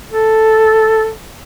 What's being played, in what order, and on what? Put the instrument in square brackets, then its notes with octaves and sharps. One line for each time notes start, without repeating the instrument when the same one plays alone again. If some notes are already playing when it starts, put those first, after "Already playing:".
[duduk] A4